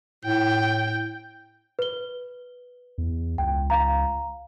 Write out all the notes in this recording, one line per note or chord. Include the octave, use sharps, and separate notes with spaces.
A2 G5
B4 G7
E2
C#2 G5
F5 A#5